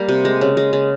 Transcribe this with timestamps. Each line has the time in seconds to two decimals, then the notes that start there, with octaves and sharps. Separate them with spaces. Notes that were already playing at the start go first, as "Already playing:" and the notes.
Already playing: G3 A#3
0.08 C3
0.25 G#3
0.41 C#3
0.57 G#3
0.73 C#3